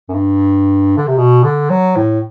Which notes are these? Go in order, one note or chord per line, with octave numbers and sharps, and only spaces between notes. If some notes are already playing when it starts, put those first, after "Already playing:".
F#2
G2
D3
C3
B2
D3
F#3
A2